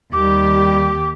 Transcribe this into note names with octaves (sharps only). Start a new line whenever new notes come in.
D#2 G3 G4 D6